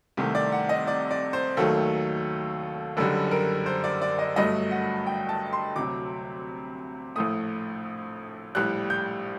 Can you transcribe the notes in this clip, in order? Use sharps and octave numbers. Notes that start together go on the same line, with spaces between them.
C2 C3 D#3 A3
D5
F#5
D#5
D5
D5
C5
D#2 D#3 F#3 A3 A4
F#1 F#2 D3 G3 A4
A#4
C5
D5
D5
D#5
G1 G2 F#3 A3 D#5
F#5
G5
A5
C6
D2 C3 F#3 D6
A#1 A2 A3 D#6
A#1 A2 G3 F#6
G6